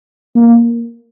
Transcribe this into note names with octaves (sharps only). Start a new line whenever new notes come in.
A#3